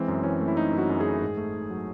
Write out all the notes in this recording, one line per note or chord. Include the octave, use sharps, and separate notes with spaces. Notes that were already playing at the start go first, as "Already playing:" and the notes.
Already playing: E3 G#3 C4
F#2
E3 C#4
A3
E4
A3 D#4
F#2
F#4
F#2
A3 G#4
G#2
A3
G#2
F#3